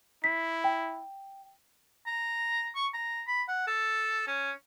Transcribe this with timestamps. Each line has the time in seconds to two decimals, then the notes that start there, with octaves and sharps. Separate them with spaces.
0.24 E4 B6
0.64 G5
2.07 A#5
2.75 C#6
2.94 A#5
3.27 B5
3.48 F#5
3.67 A4
4.27 C#4